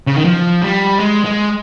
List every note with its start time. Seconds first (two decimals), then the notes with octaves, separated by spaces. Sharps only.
0.07 C#3
0.16 D#3
0.25 F3
0.62 G3
0.99 G#3
1.25 G#3